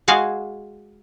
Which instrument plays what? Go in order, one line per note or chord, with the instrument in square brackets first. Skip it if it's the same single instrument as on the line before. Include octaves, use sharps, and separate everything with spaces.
[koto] G#3 F#4 G#4 F5